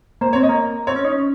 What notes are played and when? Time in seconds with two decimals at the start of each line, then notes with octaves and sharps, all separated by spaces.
0.21 A#3 C5
0.33 C4 C#5
0.43 D#5
0.49 A#3
0.87 C4 C#5
0.96 C#4
1.05 D#4
1.12 C#4